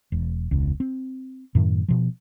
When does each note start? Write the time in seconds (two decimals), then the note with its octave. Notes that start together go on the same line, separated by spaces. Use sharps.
0.12 E1
0.51 E1 C#2
0.80 C4
1.55 F#2 A2 D#3
1.88 B2 F3